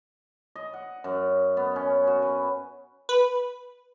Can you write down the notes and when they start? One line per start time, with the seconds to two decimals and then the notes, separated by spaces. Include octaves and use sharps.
0.55 D#5
0.73 F#5
1.04 F#2
1.57 B3
1.76 C#4
2.07 F#4
2.22 B4
3.09 B4